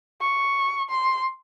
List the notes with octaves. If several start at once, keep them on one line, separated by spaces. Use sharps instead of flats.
C#6
C6